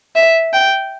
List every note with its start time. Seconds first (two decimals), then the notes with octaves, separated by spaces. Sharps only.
0.16 E5
0.53 G5